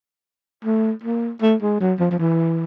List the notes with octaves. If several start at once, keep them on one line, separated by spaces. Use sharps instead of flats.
A3
A#3
A3
G#3
F#3
F3
F3
E3